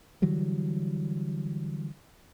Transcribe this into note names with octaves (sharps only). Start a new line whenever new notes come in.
D3 E3 F#3 G3